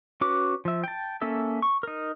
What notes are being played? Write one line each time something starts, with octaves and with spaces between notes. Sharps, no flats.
C#4 F#4 B4 D6
F3 E5
G5 A5
A#3 C#4 A4 E5
C#6
D#4 A#4